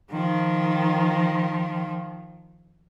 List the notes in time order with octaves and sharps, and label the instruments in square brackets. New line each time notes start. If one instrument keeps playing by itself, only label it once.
[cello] D#3 F3